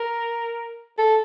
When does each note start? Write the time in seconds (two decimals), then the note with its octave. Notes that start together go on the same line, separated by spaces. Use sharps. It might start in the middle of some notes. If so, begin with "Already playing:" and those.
Already playing: A#4
0.98 A4